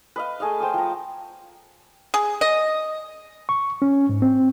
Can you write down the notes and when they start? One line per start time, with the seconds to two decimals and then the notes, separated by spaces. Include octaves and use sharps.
0.16 B4 D#5 F5
0.40 A3 G#4 D#5 F5
0.60 C5 G5 D#6
0.74 F3 A#5
2.14 G#4
2.41 D#5
3.49 C#6
3.82 C#4
4.09 G#2
4.22 C4